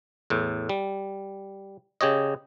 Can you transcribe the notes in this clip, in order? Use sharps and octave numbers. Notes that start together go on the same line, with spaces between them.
E2 A2
G3
C#3 G4 C#5 D#5